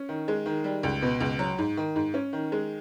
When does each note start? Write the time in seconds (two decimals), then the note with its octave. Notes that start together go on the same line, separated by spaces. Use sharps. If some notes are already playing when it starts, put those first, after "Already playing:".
Already playing: C#4
0.09 D#3
0.28 G#3
0.46 D#3
0.64 G3
0.83 C#2
1.02 B2
1.20 C#2
1.39 F#3
1.58 G#2
1.77 D#3
1.96 G#2
2.14 C#4
2.33 D#3
2.52 G#3